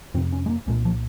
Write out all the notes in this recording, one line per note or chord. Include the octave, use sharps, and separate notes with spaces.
F2 C3 C4
C#4
G#3
A#3
C2 A#2 G#3
F3